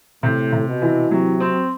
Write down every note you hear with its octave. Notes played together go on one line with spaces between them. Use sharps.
A2 C3
C3
B2
E3
C3 F#3
C4